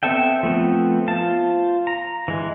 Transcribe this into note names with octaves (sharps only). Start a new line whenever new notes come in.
B3 C4 A4 E5 G5
F3 A3 B3 C4
F4 C5 A5
A#5
E3 G#3